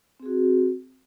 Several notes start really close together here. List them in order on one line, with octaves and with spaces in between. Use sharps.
C4 G#4 F#4